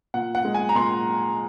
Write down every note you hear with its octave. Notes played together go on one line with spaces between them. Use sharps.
A#2 F#5
F#5
G#3
G#5
A#5
A#2 C6